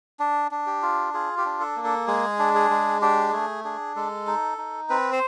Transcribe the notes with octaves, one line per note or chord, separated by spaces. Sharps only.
D4
D4
G4
F4
F4 G#4
G4
D4
A4
A#3
A4
G#3 G#4
D4
G#4
G#3
D4 G4
A3 G#4
D4 G#4
G#3 A4
D#4
D#4
C4 B4
C5